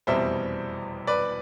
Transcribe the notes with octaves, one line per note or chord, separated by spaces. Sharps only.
F1 E2 B2 G3 C5 E5
B4 D5